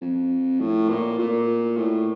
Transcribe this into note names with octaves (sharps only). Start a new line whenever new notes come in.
F2
A2
A#2
A#2
A2